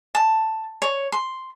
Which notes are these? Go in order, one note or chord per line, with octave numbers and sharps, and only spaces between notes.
A5
C#5
C6